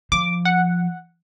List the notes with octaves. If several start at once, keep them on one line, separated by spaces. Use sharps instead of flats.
F3 D6
F#5